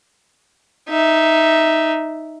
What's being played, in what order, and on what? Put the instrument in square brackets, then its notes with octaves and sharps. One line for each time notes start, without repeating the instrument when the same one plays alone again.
[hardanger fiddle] D#4 E5